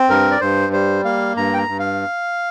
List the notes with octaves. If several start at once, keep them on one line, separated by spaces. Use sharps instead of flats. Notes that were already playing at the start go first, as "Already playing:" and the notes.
Already playing: C4
G2 A#4
D5
G2 C5
G3 C5
A#3 F5
G2 A#5
G5
A#5
G2
F5